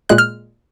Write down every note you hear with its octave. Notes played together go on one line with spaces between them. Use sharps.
A#2 G#3 F#6
F6